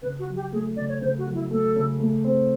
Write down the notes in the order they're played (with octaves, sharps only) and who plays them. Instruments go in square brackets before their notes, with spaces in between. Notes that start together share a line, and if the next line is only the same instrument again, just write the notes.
[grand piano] C#3 [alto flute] B4
[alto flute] F#4
[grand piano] F#3
[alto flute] G4
[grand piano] A3 [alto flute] G#4
[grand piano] C#3 [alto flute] D5
[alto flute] C#5
[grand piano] C#3 [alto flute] C5
[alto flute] F#4
[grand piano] F#3
[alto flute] E4
[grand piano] A3 [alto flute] A4
[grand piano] C#3
A3
C4